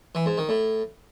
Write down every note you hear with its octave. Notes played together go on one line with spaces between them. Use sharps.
E3
G#2
D#3
A2